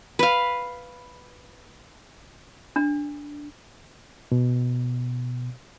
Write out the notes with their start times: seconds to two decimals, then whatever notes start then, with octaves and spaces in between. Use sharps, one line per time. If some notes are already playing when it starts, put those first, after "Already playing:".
0.19 B4 F5
2.76 D4
4.32 B2